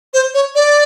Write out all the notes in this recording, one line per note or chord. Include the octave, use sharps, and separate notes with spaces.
C5
C#5
D5